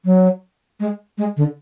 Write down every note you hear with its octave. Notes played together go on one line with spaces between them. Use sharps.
F#3
G#3
G#3
D3